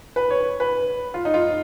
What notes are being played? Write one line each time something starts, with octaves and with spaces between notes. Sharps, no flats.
B4
C#5
B4
F4
D#4
F4